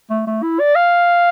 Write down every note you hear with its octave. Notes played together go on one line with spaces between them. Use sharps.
A3
A3
E4
D5
F5